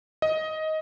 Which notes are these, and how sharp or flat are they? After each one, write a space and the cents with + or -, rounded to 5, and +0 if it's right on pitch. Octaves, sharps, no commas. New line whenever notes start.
D#5 +15